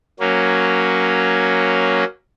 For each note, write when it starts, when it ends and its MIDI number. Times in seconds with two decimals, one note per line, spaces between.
0.20 2.04 54
0.20 2.04 58
0.20 2.04 61